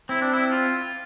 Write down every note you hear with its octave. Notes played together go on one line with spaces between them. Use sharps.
C4 E4
D4
E4
F4